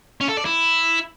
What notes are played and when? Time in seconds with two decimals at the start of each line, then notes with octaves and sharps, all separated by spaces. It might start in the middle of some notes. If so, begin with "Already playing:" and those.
0.21 C#4
0.29 A4
0.37 D5
0.45 E4